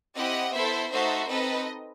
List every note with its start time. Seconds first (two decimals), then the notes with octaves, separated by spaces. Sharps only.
0.16 C4 E4 G4 D#5 F#5
0.53 B3 E4 A4 C5 E5
0.91 A3 D#4 F#4 A4 C5 E5
1.28 C4 D#4 A4 B4 D#5